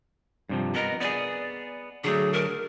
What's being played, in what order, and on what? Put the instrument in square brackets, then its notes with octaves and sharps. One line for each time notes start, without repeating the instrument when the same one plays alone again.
[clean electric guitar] G2 C3 F3
[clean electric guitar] B3 A#4 [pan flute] D#5
[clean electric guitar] B3 G#4 [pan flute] D5
[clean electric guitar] D3 F#3 A3 [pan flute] G#4
[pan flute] A#4